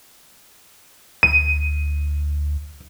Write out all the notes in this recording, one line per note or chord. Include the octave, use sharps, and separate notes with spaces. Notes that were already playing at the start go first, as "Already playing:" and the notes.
D2 D#7